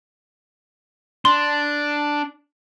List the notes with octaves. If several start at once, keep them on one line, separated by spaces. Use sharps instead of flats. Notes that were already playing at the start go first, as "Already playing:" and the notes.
D4 C6